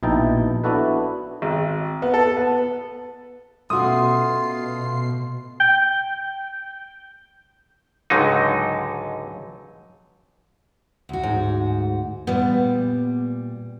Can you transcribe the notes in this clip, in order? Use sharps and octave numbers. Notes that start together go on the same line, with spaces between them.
A#1 B2 D#4 E4 G5 A5
B3 D4 E4 F#4 A4 B4
G#1
B3
A4
B3
B2 A3 C#4 F4 F#4 D#6 C7
G5
C#2 G#2 D3 F#3 D#4
D2 F#4
G#2
A#2 G3 B3